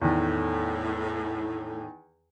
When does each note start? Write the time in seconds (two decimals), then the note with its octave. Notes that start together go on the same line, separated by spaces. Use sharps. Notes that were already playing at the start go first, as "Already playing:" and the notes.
0.02 E2 A2 D#3